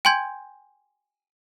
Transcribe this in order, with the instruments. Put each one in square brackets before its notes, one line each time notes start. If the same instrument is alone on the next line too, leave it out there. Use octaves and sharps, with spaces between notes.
[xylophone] G5 G#5 C6 G6 G#6